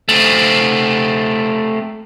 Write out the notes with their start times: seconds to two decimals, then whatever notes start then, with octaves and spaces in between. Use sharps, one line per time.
0.09 A3 C4